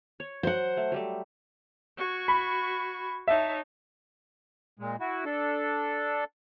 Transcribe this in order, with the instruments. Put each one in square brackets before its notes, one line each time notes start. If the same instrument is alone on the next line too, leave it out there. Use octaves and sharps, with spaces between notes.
[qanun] C#5
[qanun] F#3 [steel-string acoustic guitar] C5 F#5
[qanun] A3
F#3 G3 A3
[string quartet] F#4 C#6 G#6
[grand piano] B5
[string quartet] D#4 C#5 A5 [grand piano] E5
[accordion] A#2 G#3
E4 F#4
D4 A4